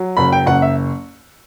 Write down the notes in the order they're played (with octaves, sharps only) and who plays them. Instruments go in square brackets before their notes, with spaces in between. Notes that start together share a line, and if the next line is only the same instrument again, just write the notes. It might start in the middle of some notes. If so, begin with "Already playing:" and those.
Already playing: [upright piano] F#3
F#1 B5
G5
F#1 F#5
E5